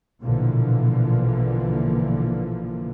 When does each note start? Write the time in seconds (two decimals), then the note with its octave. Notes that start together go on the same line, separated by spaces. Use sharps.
0.23 A#1 B2 D3 E3 F3 A#3